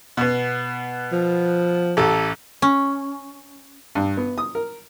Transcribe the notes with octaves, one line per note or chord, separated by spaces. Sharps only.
B2 B3
F3
A1 G4 A4
C#4
G2
B3
D#6
A#4